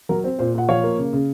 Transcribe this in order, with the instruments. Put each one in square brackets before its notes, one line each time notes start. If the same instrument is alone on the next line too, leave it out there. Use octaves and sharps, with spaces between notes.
[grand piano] F#3 A#4
C4
A#2 C5
A#2 F#5
F3 C#5 F5
A#3
C#3
C#3